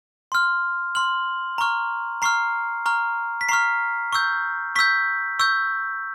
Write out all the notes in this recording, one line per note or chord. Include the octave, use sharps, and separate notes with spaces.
C6 F6
C6 F6 F#7
A#5 C#6 F6
A#5 C#6 F6 C7
A#5 C#6 F6
B6
A#5 C#6 F6 C7
C#6 E6 G6
C#6 E6 G6 B6
C#6 E6 G6